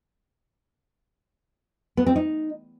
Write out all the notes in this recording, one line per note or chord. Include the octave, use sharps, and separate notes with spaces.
B3
C4
D#4